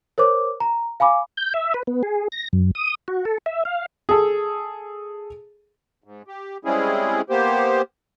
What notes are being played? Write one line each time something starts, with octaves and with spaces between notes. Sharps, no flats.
A#4 C5 C#5 D6
A#5
F5 G#5 B5 D6
G6
E5
B4
B3
G#4
A#6
F#2
D#6
F#4
A4
E5
F5
G#4 A4
G#2
G4
G3 G#3 C4 C#4 E4 G#4
A#3 B3 G4 C5